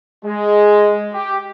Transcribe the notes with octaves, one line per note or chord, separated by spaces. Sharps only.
G#3
G4